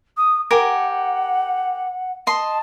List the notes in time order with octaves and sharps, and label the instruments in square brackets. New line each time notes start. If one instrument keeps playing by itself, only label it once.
[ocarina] D#6
[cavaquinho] G4 A#4 G#5 [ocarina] F#5
[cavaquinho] D#5 C6 [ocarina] A5